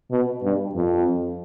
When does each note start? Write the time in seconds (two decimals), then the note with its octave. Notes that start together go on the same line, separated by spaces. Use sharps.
0.11 B2
0.43 G2
0.75 F2